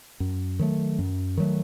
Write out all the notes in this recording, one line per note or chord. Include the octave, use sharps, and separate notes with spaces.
F#2
D#3 F#3 A3
F#2
D#3 F#3 A3